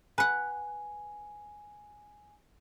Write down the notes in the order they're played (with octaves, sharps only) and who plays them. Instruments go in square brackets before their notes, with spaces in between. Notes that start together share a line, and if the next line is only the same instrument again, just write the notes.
[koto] B4 F#5 [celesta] G#5